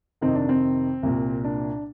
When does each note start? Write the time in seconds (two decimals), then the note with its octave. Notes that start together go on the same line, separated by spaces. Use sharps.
0.21 F2 C3 D#3 C4 D#4
0.35 D4
0.49 C4
1.03 C2 A#2
1.44 D4